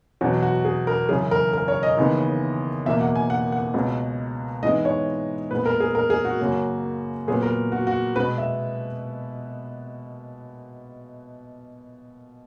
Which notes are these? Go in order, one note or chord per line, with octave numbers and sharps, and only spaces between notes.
E2 B2 F#3 B3 F#4
F#4
G#4
A#4
F#2 C#3 E3 G#4
A#4
A#4
C#5
D#5
D#2 C#3 E3 B3
E2 B2 A#3 E5
F#5
G#5
F#5
F#5
C#2 B2 G#3 B3
G#2 E3 G#3 B3 D#5
C#5
A#2 G#3 B3 B4
A#4
G#4
A#4
G#4
F#4
F#2 C#3 F#3 A#3
A#2 F#3 B3 G#4
A#4
F#4
F#4
B2 G#3 B3 B4
E5